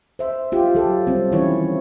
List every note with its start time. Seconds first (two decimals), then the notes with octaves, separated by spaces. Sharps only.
0.19 C5 E5
0.52 F4 G4
0.75 F#3 A4
1.07 G3 C4
1.32 D#3 E3 C#4 E4 C#5